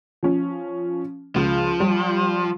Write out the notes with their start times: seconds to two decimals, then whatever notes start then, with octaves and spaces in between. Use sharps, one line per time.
0.23 F3 C#4
1.36 C#2 F3
1.80 G3